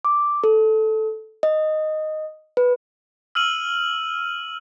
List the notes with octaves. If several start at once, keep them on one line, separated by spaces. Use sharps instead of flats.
D6
A4
D#5
B4
E6 F6 D#7 F#7